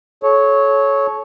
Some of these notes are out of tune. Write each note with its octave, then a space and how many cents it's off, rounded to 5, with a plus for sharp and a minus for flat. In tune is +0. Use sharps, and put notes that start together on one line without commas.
A4 -35 C#5 +0